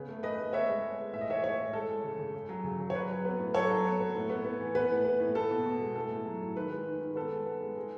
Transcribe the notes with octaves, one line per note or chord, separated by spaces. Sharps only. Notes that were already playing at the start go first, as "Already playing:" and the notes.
Already playing: C#3 B3
A3
A3 B4 D#5
A3
B3 C#5 E5
G#3
B3
G#3
A2 E5
D#5
E3 C#5 E5
A2 C#5 E5
A2
G#3 A4
G#3
C#3
C#3
C#3
F#3
C#3
C#3
C#5
F#3 B4
F#3
B3
A2
F#3 A4 C#5
F#3
B3
B3
A2
B3
B3
E3
B3 B4
A2
B3
A2
B3 A4
B2
B2
G#3
A2 A4
A2
F#3
A2
D#3 B4
G#3
D#3
D#3
B3 A4
G#3
B3
G#3
G#3